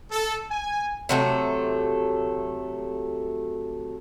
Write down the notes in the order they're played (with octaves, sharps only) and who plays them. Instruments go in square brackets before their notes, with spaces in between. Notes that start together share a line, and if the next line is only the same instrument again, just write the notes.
[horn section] A4
G#5
[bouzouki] C3 F#3 A3